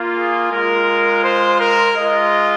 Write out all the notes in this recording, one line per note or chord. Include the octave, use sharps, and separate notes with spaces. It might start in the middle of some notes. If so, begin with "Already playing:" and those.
Already playing: A#3 F4
G#4
G#3 F4 A#4
C5
A#4
G#3 F4 D#5